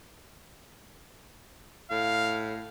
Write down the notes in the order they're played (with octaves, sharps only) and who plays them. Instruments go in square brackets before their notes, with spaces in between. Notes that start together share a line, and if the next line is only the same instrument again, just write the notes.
[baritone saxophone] A2 [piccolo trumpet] F5